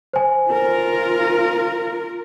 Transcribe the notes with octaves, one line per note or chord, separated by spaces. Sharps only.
C5 G#5
F4 A#4